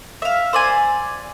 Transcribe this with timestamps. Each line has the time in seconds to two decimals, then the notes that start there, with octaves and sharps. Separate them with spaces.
0.22 E5 F5
0.53 C5 D5 G#5